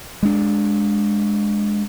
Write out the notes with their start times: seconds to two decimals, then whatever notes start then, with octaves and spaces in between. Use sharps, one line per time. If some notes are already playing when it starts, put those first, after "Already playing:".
0.23 G#3 D4